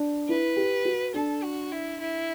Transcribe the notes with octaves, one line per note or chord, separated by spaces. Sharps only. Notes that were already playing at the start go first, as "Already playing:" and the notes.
Already playing: D4
E4 B4
G4
F#4
D4 A4
F#4
E4
E4